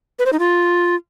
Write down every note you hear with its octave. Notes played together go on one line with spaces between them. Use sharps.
B4
C5
D#4
F4